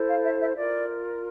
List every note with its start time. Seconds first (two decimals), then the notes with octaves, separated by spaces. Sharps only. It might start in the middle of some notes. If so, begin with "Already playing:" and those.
Already playing: E4 A4 C5
0.09 F5
0.25 E5
0.40 E5
0.56 F4 A#4 D5